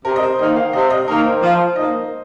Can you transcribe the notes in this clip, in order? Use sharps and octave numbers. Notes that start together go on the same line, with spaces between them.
C3 A#4
D#5
C5
D#3 A#3 D#5
F5
C3 D#5
D#5
D#3 A#3 A#4
C5
F3 C5
A#3 D#4 D#5